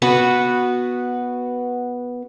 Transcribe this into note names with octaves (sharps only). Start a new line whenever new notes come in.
B3 F#4 B4